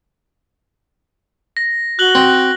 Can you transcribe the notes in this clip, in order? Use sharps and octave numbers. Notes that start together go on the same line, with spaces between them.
A#6
F#4 F#6 F#7 G7
C4